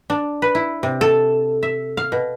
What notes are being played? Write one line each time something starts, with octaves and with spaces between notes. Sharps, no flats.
D4
B4
E4
C3
A4
E5
F5
B2